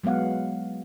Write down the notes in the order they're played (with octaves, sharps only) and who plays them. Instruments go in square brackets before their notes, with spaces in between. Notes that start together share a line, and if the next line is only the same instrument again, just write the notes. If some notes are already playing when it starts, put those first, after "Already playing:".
[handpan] F#3 G#3 B3 F5 F#5